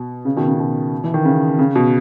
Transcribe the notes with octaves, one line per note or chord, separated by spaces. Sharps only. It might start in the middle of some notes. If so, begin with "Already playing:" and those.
Already playing: B2
C#3
B2 D#3
C#3
B2
E3
D#3
C#3
C#3
B2